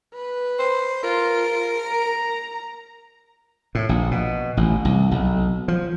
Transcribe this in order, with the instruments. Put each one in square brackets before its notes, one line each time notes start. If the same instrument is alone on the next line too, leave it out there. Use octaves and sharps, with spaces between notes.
[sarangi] B4
[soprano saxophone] C5
[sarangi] F4 [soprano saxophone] A#4
[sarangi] A#5
[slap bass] A2
A#1
B2
A1
C2
B1
F3